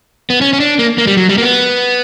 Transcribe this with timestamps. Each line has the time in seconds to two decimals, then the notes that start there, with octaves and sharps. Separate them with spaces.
0.30 B3
0.41 C#4
0.53 C#4
0.60 D4
0.79 A#3
0.98 A#3
1.07 G3
1.17 F#3
1.29 G3
1.38 A#3
1.42 B3